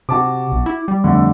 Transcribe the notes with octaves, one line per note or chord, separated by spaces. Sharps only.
C3 F#4 A5 D6
B1
E4
G3
F2 D3 A3